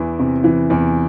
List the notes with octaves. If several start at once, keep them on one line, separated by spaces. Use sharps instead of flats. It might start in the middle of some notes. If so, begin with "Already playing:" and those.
Already playing: E2 E3
C3
E3
E2